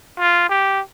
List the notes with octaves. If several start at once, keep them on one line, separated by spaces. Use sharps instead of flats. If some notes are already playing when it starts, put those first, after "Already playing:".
F4
G4